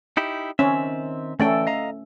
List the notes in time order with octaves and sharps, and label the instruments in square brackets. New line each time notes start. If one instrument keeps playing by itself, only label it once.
[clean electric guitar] D#4 E4 G4
[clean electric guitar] D#3 C4 E5 [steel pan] C#4
[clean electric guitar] E3 D5 G5 [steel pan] A3 C#4 A4
[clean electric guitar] D#5 F5 A#5